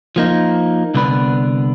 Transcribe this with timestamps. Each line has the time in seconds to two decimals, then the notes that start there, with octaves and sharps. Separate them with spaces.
0.16 F3 A#3 D#4
0.94 C2 D3 B3 B4 D5